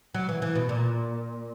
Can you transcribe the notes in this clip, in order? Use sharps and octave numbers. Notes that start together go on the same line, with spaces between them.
F#3
E3
E3
B2
A#2